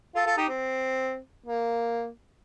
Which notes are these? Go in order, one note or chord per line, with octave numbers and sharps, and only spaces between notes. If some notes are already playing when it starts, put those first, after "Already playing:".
F4 A4
F4 A4
D#4 G4
C4
A#3